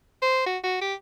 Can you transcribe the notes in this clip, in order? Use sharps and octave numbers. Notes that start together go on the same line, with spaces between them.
C5
F#4
F#4
G4